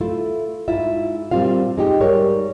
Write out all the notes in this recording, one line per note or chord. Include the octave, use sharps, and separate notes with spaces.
A3 E4 F4
G#2 E4 F4 E5
A#2 G3 C4 F4 F5
G#3 D#4 G4
G#2 G3 A#4 C#5